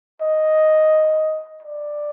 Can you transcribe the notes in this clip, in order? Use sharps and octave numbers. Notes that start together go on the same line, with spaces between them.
D#5
D5